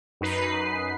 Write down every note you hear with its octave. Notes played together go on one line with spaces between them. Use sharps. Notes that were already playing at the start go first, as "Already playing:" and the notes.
F#2 D#4 B4 C7